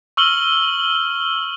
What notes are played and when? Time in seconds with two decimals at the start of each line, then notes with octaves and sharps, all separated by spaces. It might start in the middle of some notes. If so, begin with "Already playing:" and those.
0.17 C#6 E6 F6 F#7 G7